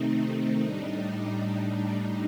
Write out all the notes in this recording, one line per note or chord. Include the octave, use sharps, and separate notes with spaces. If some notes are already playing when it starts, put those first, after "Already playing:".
Already playing: C3 D#3 A3 C4 D#4
A2 G3 D4 D#4